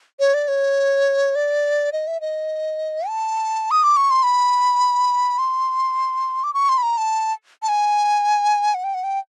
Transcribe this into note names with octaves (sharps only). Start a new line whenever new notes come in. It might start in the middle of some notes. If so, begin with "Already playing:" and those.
C#5
D5
C#5
D5
D#5
E5
D#5
A5
D#6
D6
C#6
C6
B5
C6
D6
C#6
C6
B5
A#5
A5
A5
G#5
F#5
G5
F#5
G5